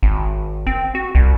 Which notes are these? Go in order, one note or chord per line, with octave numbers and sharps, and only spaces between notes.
G#1
C4
F#4
C2